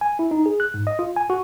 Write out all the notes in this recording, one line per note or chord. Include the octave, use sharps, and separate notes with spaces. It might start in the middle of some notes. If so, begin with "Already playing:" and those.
G#5
E4
D#4
G#4
F#6
G#2
D#5
F4
G#5
F#4